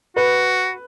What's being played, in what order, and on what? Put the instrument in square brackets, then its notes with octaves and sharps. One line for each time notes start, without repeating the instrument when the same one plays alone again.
[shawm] F#4 [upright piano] B4